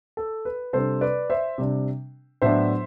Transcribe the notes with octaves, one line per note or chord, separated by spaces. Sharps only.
A4
B4
C3 G3 D4 A4 C5
B4 D5
C5 E5
C3 G3 D4
A2 F#3 B3 D4 C5 E5